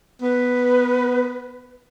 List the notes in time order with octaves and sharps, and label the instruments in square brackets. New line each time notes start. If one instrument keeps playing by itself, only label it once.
[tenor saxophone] B3 [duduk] B4